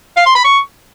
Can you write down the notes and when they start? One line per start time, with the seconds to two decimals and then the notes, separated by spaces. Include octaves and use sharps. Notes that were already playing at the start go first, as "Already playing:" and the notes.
0.17 F5
0.26 C6
0.35 B5
0.44 C#6